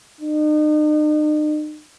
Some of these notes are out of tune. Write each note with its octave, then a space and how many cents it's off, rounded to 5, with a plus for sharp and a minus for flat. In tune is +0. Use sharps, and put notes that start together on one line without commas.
D#4 -40